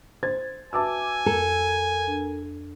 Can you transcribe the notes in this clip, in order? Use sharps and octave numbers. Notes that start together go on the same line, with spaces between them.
C5 G#6 A6
F#4 B4 E5 G#5 A5 D6 E6
F2 A4 A#4
D4